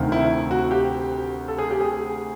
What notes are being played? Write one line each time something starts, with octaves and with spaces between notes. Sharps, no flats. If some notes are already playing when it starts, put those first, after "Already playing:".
Already playing: D2 C3 D#3
E4
F#4
G4
A4
G#4
G4
G#4